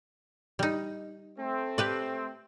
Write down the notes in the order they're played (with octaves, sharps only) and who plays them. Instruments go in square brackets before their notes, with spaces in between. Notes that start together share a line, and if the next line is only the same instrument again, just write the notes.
[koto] G3 D#4
[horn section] A3 C4
[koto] G4 B4 D5